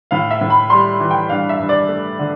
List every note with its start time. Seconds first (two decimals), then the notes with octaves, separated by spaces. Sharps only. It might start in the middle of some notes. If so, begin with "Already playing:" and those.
0.11 A2 F5
0.31 E5
0.41 A2
0.50 B5
0.70 G3 C6
1.00 E3
1.11 G5
1.29 G2 F5
1.49 E5
1.59 G2
1.69 D5
1.88 A3
2.19 D3